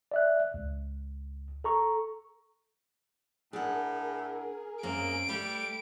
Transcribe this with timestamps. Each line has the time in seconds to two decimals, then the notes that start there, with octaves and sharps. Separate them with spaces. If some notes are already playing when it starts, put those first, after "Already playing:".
0.12 D5 E5 F#6
0.54 C#2
1.64 A4 A#5 C#6
3.53 A2 D4 G#4 A#4 F#5
4.83 F#2 A#3 C4 D7
5.29 G3 A3